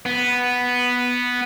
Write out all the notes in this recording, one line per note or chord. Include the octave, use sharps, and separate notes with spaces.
B3